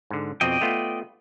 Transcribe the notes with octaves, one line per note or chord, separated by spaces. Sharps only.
G#2 D3
F2 B2 C4 D5 D#5 G5
A3 B3 F4